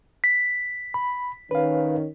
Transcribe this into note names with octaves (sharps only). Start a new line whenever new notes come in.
B6
B5
D#3 C#4 B4 F5